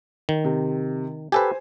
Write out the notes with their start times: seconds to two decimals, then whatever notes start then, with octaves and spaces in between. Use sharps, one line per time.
0.29 D#3
0.44 C3
1.32 G4 A4 B4 C5 G#5